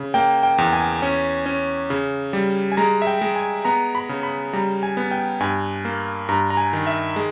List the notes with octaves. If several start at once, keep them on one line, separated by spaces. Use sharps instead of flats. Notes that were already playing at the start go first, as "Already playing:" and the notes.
Already playing: C#3
A#3 G5
G5
E2
G#5
C#4
C#4
C#3
G3
G#5
G#3 A#5
E5
G5
G#3
G#5
B3 A#5
B5
C#3
B5
G3 A#5
G#5
B3
G5
G2 G#5
A#3
G2 A#5
A#5
G#5
D#3
E5
G#3